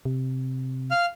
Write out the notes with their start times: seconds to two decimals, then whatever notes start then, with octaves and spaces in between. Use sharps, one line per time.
0.05 C3
0.91 F5 F6